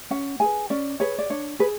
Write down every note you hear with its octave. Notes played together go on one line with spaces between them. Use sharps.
C#4 F#5
G#4 B4 G#5
C#4 D5
G#4 B4 C#5
D5
D4 C#5
G#4 B4